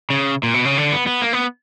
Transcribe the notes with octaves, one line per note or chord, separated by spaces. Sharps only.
C#3
A#2
B2
C#3
D3
B3
B3
A#3
B3